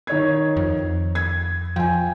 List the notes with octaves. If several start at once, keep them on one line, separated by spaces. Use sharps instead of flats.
D#3 C#5 G#6
F2
G#6
F3 G5 G#5